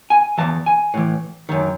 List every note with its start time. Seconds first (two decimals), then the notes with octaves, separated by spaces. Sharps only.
0.10 G#5
0.38 E2 C#3 E3 A5
0.66 G#5
0.94 A2 E3
1.49 F#2 D#3